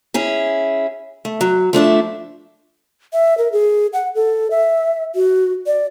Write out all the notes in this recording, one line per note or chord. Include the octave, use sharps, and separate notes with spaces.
C#4 E4 G#4
A3
F#3
F3 A3 D4 E5
E5
A#4
G#4
F#5
A4
E5
F#4
D5